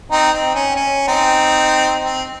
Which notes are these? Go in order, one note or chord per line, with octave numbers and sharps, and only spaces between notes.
C4 D#4
C4
C#4
C#4
C4 D#4
C4